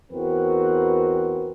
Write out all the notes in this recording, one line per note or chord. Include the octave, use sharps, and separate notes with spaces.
E2 C4 F#4 A#4 B4